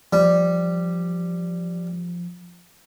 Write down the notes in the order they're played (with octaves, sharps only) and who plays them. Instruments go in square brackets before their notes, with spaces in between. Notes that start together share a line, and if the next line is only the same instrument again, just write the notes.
[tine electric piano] F3 [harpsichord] G3